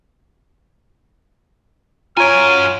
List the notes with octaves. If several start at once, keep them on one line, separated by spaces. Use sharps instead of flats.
F#2 F4 C#5 G#5 A#5 F6 G#6 D7